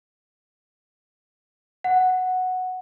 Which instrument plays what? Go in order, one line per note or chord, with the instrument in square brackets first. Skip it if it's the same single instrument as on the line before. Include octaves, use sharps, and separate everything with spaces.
[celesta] F#5